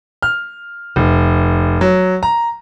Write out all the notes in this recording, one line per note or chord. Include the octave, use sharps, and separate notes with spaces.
F6
F1
F#3
A#5